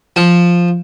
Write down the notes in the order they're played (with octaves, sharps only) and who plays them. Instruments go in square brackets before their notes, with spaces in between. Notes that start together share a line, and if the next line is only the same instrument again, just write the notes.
[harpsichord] F3